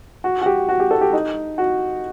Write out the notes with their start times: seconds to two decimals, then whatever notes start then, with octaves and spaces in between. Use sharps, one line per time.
0.24 F#4
0.42 F#4
0.46 G4
0.69 F#4
0.80 G4
0.91 A4
1.01 G4
1.13 D#4
1.58 F#4